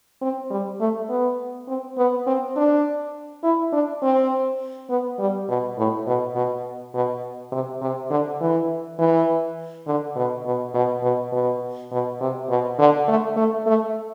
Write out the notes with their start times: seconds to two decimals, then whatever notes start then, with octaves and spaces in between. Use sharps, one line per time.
0.22 C4
0.51 G3
0.80 A3
1.09 B3
1.68 C4
1.98 B3
2.27 C4
2.56 D4
3.44 E4
3.73 D4
4.03 C4
4.90 B3
5.19 G3
5.49 B2
5.78 A2
6.07 B2
6.35 B2
6.94 B2
7.52 C3
7.82 C3
8.11 D3
8.41 E3
8.99 E3
9.87 D3
10.16 B2
10.45 B2
10.74 B2
11.03 B2
11.32 B2
11.92 B2
12.21 C3
12.49 B2
12.79 D3
13.08 A3
13.37 A3
13.67 A3